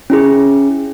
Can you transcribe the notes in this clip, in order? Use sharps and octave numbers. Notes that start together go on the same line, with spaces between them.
C#4 E4 G#4